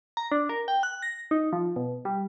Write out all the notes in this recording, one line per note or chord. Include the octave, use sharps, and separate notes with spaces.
A#5
D4
A#4
G5
F#6
A#6
D#4
F3
B2
G3